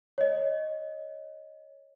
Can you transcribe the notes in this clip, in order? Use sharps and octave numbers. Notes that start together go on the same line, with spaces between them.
C#5 D#5